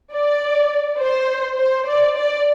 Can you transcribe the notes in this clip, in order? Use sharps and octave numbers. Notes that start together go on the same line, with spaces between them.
D5
C5
C5
D5
D5